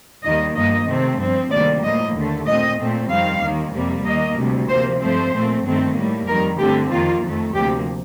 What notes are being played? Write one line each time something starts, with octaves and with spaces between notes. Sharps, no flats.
D#2 D#3 G3 A#3 D#5
G2 F3 A#3 D#5
C3 D#3 A3 C4
G2 F3 C4
D2 C3 D#3 G3 A#3 D5
A2 F3 A#3 D#5
D#2 D3 A3
A#2 A3 C4 D#5
A#2 A3 C4
F2 D#3 G3 C4 F5
D#2 D#3 A#3
F2 C3 G3 A#3
D#2 D#3 A#3 D#5
D2 C3 G3
C3 F3 A#3 C5
G2 F3 A3 C4 C5
A#2 A3 C4
G2 D#3 A3 C4
A2 G3 A#3
F2 D#3 G3 A#4
G2 D3 A3 C4 G4
F2 D#3 A#3 F4
F2 D#3 A3
D2 C3 F3 A#3 G4